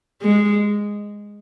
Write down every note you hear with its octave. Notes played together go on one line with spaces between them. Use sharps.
G#3